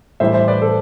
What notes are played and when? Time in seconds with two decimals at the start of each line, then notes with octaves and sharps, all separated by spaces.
0.20 A2 E3 G3 C5 E5
0.34 C5 E5
0.48 B4 D5
0.62 A4 C5